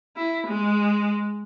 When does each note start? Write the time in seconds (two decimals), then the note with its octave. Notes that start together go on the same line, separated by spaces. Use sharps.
0.17 E4
0.47 G#3